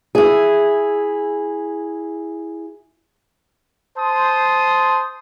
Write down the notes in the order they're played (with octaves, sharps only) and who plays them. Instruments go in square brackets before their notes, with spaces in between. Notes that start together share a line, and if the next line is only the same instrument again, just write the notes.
[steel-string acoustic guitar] E4 G#4
[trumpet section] C5 A5 C6 D#6